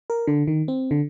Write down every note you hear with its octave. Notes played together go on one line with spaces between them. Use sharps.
A#4
D3
D#3
C4
D3